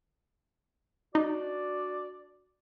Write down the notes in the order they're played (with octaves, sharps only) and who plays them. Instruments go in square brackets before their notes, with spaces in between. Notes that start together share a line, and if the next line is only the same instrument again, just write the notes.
[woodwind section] D4 F#4 D5 [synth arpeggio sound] D#4